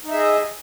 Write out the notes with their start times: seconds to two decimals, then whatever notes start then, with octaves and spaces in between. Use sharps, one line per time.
0.05 D#4
0.09 E5
0.14 G#4
0.18 D#5